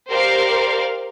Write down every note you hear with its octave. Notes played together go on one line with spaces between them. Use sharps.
G4 A#4 C5 D5 F5